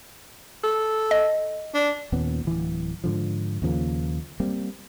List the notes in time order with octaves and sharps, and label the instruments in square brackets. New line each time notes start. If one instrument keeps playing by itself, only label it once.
[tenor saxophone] A4
[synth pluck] D#5
[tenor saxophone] D4
[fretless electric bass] D#2 A#2 B3 C#4
D1 E3
G#2 D3 F3
D#2 C#3 F3 A#3
G3 A#3 C4